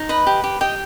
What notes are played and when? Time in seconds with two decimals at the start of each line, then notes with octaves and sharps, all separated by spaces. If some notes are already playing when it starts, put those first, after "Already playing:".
Already playing: D#4
0.09 B4 D#5 B5
0.26 G4
0.44 G4
0.61 G4 D#5 G5